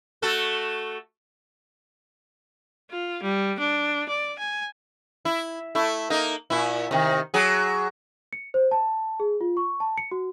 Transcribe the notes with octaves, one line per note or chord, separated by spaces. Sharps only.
A3 F#4 A4
F4
G3
D4
D5
G#5
E4
A3 E4
A#3 D#4
A#2 E4
C3 D#3
F#3 G#4
C#7
C5
A5
G#4
F4
C#6
A5
C#7
F#4